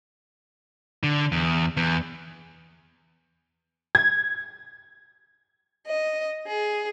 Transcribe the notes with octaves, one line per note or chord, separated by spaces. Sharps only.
D3
E2
E2
G#6
D#5
G#4